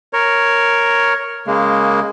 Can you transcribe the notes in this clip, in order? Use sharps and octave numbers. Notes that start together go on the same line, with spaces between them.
A#4 C#5
C#3 G#3 A#3